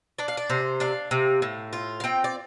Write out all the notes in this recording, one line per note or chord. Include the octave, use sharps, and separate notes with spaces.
D4 D5
F5
D5
C3 C5
D4 F5
C3
A2
F4
F5
C4 G5
D5